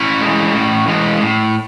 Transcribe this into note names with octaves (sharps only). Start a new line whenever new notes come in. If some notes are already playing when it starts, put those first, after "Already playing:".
Already playing: C#4 E4
E3 G#3
A2
E3 G#3
A2